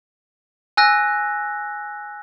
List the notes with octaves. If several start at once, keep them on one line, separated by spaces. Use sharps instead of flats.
G#5 E6 F#6 A#6